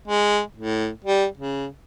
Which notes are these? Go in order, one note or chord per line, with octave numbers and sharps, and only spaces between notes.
G#3
A2
G3
C#3